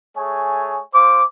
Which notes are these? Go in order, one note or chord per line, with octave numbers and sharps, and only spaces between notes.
A3 G#4 C#5 G#5
F4 C5 D6